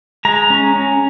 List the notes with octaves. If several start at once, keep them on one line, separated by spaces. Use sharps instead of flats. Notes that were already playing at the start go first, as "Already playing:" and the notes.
G#3 A#5
C#4
C#4